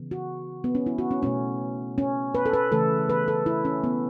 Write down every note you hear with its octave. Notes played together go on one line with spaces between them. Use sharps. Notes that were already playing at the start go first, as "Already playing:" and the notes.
Already playing: C#3 E3 B3
F#4
B3
C#4
E4
F#4
C#4
B2 A3 C#4
C#4
B4
A4
B4
C#3 E3 A3 A4
B4
A4
E4
C#4
B3